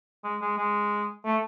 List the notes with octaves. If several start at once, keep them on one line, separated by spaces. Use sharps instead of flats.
G#3
G#3
G#3
A3